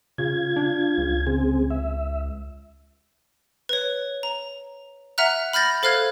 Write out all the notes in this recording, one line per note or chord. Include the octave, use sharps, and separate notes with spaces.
C#3 F4 G#6
D4
C#2
C#3 C4 G#4
E5
B4 C#5
A#5
E5 F#5 A#5 F6 F#6
B5 F6 G6 A6 A#6
A4 C5 F5 F6 F#6 G#6